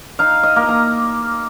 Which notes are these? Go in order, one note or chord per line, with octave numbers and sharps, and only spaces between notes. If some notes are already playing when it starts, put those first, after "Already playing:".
D#4 F5
D#5
A#3
A#5